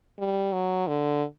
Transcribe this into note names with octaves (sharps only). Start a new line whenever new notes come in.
G3
F#3
D3